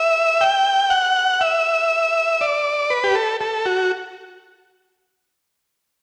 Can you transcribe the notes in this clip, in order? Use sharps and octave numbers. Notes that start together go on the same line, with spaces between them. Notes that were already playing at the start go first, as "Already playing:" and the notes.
Already playing: E5
G5
F#5
E5
D5
B4
G4
A4
A4
F#4